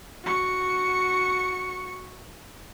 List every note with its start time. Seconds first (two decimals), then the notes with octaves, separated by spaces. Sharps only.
0.24 F#4 C#6